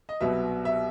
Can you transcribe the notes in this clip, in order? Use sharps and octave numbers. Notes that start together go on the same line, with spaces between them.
D#5
C2 B2 F#3 B3 E5
E5